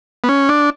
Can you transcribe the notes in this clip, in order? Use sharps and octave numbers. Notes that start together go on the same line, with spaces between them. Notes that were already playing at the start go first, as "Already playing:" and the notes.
B3
C#4
D4